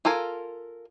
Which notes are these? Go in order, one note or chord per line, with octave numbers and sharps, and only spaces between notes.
F4 A4 A#4 G#5